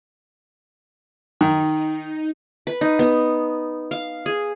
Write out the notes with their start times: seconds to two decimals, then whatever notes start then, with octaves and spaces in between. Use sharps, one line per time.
1.41 D#3 D#4
2.67 B4
2.81 D#4
2.99 B3
3.91 F5
4.26 G#4